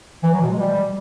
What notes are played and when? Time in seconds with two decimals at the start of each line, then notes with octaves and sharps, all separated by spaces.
0.24 E3
0.32 F#3
0.41 B2
0.50 G#3
0.59 G3